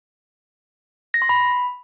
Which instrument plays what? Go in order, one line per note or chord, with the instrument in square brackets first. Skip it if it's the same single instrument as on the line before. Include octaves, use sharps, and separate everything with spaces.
[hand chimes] A#6
C6
B5